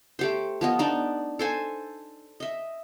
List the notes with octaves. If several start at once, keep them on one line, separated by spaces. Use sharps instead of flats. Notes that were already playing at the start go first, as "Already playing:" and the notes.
A3 G4 C5
F3 B3 D#5
B3 D4 D#4
A4 C5 G#5
D#5 E5